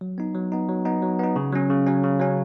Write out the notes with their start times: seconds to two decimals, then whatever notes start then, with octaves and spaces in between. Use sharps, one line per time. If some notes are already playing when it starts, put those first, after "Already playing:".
0.01 F#3
0.18 B3 D#4
0.35 F#3
0.52 B3 D#4
0.69 F#3
0.85 B3 D#4
1.02 F#3
1.19 B3 D#4
1.36 C#3
1.52 F#3 C#4
1.70 C#3
1.87 F#3 C#4
2.04 C#3
2.20 F#3 C#4